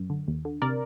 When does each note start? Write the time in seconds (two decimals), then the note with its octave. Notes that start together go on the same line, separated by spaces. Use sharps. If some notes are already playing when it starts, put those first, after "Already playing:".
Already playing: F#2
0.10 D3
0.28 D#2
0.45 D3
0.62 C3 A#4 D5